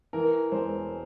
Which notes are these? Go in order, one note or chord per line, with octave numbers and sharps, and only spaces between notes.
E3 A#4
E1 C5